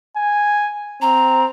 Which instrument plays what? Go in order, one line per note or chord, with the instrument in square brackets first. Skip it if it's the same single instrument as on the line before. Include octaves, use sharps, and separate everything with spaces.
[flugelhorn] G#5
[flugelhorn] C4 [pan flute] A#5